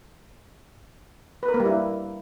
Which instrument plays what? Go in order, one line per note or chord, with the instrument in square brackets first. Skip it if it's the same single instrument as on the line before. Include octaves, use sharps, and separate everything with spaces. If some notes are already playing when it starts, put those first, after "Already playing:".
[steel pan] B4
A#4
A#3
G3
E4